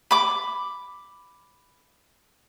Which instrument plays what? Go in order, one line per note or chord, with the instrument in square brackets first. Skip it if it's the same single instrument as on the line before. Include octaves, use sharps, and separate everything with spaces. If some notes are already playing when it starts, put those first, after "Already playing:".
[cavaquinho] B5 D6